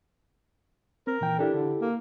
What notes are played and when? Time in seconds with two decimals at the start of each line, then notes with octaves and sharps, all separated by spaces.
1.07 C4 A#4
1.21 A#2 E3 G5
1.39 D4 E4 G4 A4
1.54 D3
1.81 A#3